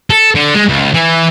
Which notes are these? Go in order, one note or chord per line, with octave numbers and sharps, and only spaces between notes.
A4
D3
G#3
C#2
E3